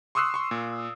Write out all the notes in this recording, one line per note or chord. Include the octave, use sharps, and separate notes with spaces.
C6 C#6 D#6 E6 F#6 C7
C6 C#6
A#2